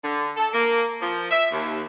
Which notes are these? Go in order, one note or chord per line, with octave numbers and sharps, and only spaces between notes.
D3
A4
A#3
F3
E5
D#2